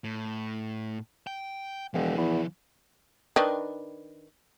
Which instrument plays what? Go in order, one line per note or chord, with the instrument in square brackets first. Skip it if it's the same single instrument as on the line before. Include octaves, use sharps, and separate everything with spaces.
[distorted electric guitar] A2
G5
[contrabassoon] E1 [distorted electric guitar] F3 E4
[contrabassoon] E2
[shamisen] D#3 D4 B4